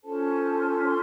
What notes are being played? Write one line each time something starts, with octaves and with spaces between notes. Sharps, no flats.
C#4 F4 A4 C5 A5
C6